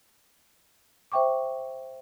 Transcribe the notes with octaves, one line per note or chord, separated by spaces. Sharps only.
C5 E5 G5 C#6 D6